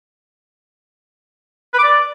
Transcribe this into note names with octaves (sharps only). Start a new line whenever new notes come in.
B4
D6
D5